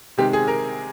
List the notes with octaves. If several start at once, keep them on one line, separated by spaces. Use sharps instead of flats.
C3 D#3 G#3 C4 G4
G#4
A#4